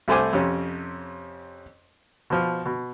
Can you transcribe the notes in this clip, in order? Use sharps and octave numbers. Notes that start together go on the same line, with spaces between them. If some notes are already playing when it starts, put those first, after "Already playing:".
C2 A3 C5 G#5 D6
F2 C3 C#4
B2 F3
B2